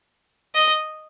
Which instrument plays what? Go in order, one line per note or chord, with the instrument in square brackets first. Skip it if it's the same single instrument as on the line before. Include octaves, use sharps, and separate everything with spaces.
[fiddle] D#5